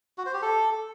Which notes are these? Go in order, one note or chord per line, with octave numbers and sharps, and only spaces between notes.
F#4
C5
G4
A4